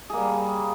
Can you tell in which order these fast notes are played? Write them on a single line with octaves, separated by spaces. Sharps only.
G#4 A#3 G3